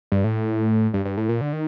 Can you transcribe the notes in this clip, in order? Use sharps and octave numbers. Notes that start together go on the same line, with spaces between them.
G2
A2
G2
G2
A2
A#2
D3
D#3